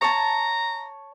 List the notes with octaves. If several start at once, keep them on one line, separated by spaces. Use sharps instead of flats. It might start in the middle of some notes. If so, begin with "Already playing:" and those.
C#5 A5 A#5